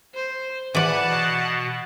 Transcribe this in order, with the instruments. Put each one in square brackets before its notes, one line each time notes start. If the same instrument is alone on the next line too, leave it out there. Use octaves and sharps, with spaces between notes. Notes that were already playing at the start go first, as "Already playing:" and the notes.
[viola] C5
[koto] E3 D5 [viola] F#5 A5 [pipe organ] B5
[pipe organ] B2